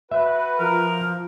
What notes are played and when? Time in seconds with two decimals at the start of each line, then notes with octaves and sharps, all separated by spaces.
0.11 F#4 B4 E5
0.59 F3 A#4